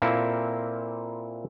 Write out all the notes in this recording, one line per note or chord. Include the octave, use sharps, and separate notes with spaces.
A#2 A#3 C4 E4 A4